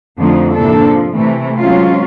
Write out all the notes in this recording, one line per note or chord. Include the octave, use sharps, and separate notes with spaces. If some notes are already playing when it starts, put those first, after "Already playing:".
F2 D3 F3 A3 D#4
G#2 C3 E3 A#3 D4 A4
F3
C3 E3 A3
F#3 G#3 C4 C#4 F4